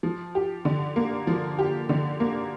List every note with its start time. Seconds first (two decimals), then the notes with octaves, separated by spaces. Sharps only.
0.03 F3
0.35 G4
0.65 D3
0.96 A#3
1.27 F3
1.59 G4
1.89 D3
2.20 A#3